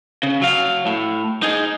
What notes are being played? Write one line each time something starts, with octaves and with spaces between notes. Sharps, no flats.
C#3
F#3 F5
A2
D#4 G#4